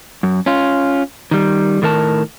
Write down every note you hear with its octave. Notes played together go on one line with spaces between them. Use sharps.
F#2
C#4 F4
D#3 G3
A2 D#3 A#4 A5